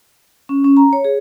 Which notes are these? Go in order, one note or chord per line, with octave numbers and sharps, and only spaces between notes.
C#4
C#4
A#5
C#5
G#4